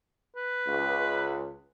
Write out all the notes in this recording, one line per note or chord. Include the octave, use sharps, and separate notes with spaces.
B4
C#2